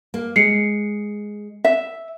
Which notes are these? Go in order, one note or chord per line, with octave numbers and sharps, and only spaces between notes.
A#3
G#3 C7 C#7
E5